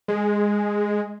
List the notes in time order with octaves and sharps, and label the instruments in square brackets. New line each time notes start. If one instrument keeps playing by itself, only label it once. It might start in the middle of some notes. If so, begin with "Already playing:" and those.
[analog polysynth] G#3